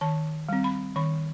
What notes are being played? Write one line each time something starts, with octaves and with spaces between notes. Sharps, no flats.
D#3 A5
G3 C4
B5
D#3 B5